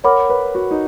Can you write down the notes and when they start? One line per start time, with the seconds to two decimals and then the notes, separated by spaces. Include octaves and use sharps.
0.04 A#4 C#5 F#5 B5 D6
0.29 B4
0.55 F#4
0.71 D#4